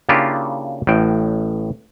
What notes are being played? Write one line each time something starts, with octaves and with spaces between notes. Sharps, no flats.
C#3 A#3 D4 E4 F4 G4
A1 A2 G5